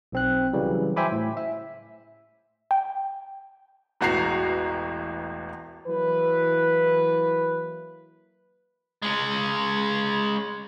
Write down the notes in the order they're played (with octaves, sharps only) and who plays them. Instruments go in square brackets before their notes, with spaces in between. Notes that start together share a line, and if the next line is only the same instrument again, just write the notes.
[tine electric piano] B1 C4 F#6
C#3 E3 F#3 G3
C5 E5 G5 G#5 B5 D6
A2
E5
[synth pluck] G5
[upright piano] E1 A1 F#4 A#5 C7
[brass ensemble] E3 F#3 A#3 E4 B4
[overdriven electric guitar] G#3 C#4